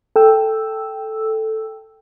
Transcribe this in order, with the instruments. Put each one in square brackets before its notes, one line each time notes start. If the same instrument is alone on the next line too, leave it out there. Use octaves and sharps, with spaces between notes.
[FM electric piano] A4 G5 E6